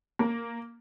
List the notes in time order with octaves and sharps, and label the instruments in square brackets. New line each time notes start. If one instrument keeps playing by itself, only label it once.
[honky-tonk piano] A#3